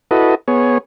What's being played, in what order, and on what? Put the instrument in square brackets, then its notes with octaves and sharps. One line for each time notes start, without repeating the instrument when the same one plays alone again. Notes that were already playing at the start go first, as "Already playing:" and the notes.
[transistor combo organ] E4 F#4 A4 B4 D#5
B3 G#4 C#5